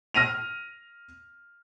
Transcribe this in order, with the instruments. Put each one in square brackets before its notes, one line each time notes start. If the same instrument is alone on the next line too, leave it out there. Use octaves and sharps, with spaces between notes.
[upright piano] F6 A#6 D#7 F7